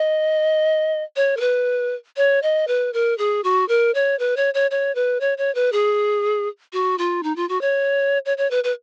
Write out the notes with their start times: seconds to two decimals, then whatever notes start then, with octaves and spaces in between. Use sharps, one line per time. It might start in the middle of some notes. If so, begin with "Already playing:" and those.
Already playing: D#5
1.16 C#5
1.37 A#4
1.40 B4
2.17 C#5
2.43 D#5
2.68 B4
2.93 A#4
3.18 G#4
3.44 F#4
3.68 A#4
3.94 C#5
4.19 B4
4.37 C#5
4.54 C#5
4.71 C#5
4.95 B4
5.20 C#5
5.38 C#5
5.55 B4
5.72 G#4
6.73 F#4
6.98 F4
7.23 D#4
7.36 F4
7.49 F#4
7.61 C#5
8.25 C#5
8.37 C#5
8.51 B4
8.64 B4